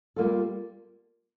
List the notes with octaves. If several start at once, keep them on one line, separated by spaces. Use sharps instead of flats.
G3 A#3 F4 A4